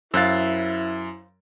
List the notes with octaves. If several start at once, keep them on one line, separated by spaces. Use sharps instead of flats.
F#2 E4 C5 F5 E6 F#6 A6